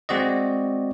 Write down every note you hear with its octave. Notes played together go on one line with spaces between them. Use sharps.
G#3 C4 F#4 D5 D#5